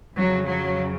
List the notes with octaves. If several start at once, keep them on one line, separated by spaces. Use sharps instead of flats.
F2 C#3 F#3
F#3